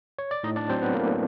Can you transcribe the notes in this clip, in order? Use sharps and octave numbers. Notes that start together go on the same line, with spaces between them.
C#5
D5
A2 D#4 D#5
D4 D5
F#3 C4 C5
B3 B4
A2 A#3 A#4